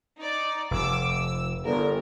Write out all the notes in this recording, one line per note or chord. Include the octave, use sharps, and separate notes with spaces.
D#4 D5
F1 D6 E6
E6
G1 A#4